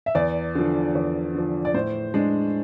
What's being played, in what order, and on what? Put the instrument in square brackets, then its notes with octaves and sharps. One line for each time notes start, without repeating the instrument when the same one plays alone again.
[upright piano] E5
E2 D5
D3 F3
E2
D3 F3
D5
A2 C5
G#3 D4